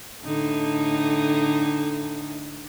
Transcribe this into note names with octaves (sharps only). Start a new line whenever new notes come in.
A2 D3 D#4